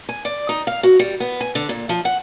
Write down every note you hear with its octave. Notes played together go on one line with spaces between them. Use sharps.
G#5
D5
D#4
F5
F#4
G3
B3
G#5
D3
A#2
F3
F#5